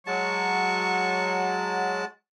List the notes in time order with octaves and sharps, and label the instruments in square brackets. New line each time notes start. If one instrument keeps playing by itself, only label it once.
[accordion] F#3 [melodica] G#3 F#4 A5 [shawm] C#6